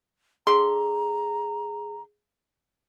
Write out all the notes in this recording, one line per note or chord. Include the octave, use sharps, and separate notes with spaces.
D3 G#4 A#5 C6